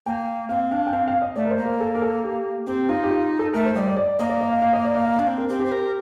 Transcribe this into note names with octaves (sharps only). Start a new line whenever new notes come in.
A#3 G5
C4 F5
D4 F5
G5
C4 F5
F5
D#5
A3 D5
A#4
C5
A#3
A#4
A4
A#4
A4
G4
C4 G4
D#4 F4
G4
F4
A4
A3 A#4
C5
G3 D#5
D5
D5
A#3 D#5
D5
D#5
F5
F5
D#5
D5
F5
F5
D4 F5
C4
A#4
C4 G4
G4
C5
A#4